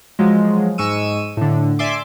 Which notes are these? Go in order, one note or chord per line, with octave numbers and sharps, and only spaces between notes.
F3 F#3 G#3
G#2 G#3 C#6 E6 D#7
A2 D3
D5 E5 G#5 C6 D6